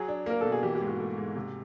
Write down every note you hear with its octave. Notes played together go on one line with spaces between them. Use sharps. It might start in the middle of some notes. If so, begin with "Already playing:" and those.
Already playing: F#3 G#4
D4
A#3 A#4
B2 A4
G#4
E3 G4
G4
G#2
F#4
A3
G#2
C3